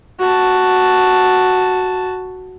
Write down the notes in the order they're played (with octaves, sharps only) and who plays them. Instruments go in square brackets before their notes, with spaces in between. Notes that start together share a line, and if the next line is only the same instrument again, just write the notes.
[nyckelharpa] F#4 A5